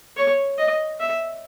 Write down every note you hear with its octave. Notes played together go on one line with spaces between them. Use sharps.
C#5
D#5
E5